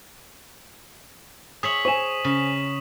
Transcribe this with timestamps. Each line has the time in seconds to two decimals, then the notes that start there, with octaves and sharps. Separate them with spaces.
1.63 G#4 C#5 E5 D#6 B6 F#7
1.85 C5 G#5 C#6 E7
2.24 C#3